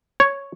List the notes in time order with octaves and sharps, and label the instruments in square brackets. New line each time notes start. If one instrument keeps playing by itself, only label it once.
[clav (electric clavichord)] C#5